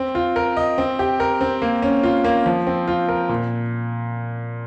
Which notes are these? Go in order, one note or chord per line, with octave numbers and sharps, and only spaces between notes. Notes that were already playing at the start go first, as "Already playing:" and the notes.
Already playing: C4
F4
A#4
D#5
C4
G4
A#4
C4
A#3
C#4
F4
A#3
F3
C4
F4
A#4
A#2